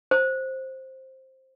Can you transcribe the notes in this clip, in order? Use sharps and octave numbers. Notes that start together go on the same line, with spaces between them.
C5